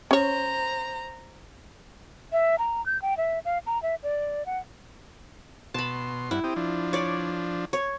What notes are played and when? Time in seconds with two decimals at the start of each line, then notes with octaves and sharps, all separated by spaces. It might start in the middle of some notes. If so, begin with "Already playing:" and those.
0.11 C#4 C5 C#5 A#5
2.32 E5
2.59 A#5
2.86 G6
3.02 G5
3.17 E5
3.45 F5
3.67 A#5
3.83 E5
4.03 D5
4.46 F#5
5.74 B2 A5 B5 C6
6.31 G2 E4 F#5
6.44 C4 G4 D#6
6.56 F3 D4
6.93 C#5 D5
7.73 C#5